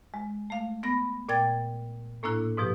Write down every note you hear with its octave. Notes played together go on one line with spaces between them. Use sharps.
G#3
A3 F5
B3 B5 A#6
A#2 D5 G5 G#6 A6
A2 A#3 D4 E4 F#6
G#2 B2 F3 G4